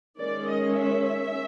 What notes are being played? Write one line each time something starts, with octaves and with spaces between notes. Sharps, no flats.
D#3 G#3 C#4 D5
D#5
E5